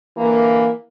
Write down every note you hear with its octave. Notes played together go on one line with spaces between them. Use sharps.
D3 E3 A#3